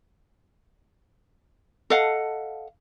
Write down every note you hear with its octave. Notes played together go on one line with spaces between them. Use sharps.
A4 D#5 F5 F#5